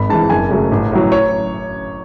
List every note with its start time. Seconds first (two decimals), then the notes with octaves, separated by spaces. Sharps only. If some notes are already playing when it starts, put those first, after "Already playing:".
Already playing: G#1 B5
0.09 G#2 E3 A5
0.30 F#1 G#5
0.50 F#2 C#3 F#3 A3
0.72 A1
0.92 A2 F#3
1.12 C#5